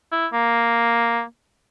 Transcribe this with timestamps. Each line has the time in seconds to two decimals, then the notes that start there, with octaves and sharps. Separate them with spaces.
0.12 E4
0.33 A#3